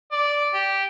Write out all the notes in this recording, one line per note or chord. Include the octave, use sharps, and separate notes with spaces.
D5
G4